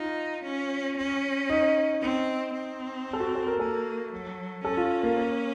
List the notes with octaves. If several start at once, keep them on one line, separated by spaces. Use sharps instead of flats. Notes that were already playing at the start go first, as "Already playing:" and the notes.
Already playing: D#4 F4
C#4
C#4
D#4
C4 D#4
C4
A4
F#4
A4
A#4
A#3 A4
F#3
C#4 A4
F4
A#3